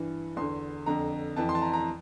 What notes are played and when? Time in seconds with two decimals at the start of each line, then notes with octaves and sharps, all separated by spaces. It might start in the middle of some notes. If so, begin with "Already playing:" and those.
Already playing: G2 E3
0.37 E2 D3 C6
0.86 F2 D3 A#5
1.36 F2 E3 A5
1.49 C6
1.55 A5
1.62 A#5
1.73 A#5